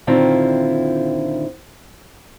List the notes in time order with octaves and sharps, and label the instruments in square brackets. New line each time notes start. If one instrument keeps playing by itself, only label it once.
[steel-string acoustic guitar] A#2 D3 D#3 C4 E4 F4